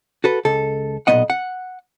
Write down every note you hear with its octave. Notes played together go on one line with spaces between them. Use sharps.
F#4 A4 B4
C#2 A4
B1 F2 A#2 B3 D#5 F#5
F#5